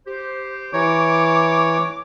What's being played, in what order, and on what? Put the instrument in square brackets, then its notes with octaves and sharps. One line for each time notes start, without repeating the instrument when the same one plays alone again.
[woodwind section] G4 C5
[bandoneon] E3 C#5 [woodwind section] A#5 C#6 D6